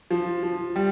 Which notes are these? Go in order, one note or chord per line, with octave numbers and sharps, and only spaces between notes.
F3
F3
G3